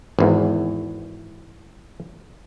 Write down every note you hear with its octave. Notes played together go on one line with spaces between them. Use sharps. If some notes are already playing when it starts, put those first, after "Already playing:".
G#1 E2